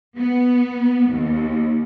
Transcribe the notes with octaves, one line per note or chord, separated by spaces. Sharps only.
B3
D#2